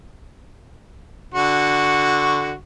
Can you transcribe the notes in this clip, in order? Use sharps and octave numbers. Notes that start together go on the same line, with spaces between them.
D3 F#4 C#6